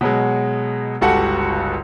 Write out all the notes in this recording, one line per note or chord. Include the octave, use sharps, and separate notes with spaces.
B2 F#3 G#3
G1 C#2 F#4 G4 A4 F#5